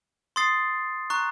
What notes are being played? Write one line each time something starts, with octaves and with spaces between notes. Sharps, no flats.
C6 D#6 A6 C7
A#5 C#6 F#6